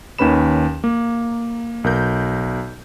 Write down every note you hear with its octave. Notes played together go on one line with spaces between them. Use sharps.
D#2 D#3 C#4 B4 B5 E7
A#3
B1 A#4 G6